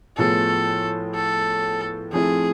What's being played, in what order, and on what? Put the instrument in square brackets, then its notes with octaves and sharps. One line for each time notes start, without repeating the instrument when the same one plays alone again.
[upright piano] A2 F3 B3 F4 G#4 [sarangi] A4
[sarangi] A4
[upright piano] F3 A3 C4 E4 [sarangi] G#4